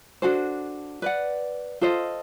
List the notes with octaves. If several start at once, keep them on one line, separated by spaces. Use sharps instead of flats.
D4 F#4 A4 C5
B4 D5 F#5
F4 A4 C5 D#5